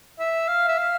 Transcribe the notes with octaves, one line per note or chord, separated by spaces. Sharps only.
E5
F5
E5
F5